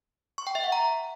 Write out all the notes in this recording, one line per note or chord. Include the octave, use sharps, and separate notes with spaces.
C#6
G5
E5
F#5
A#5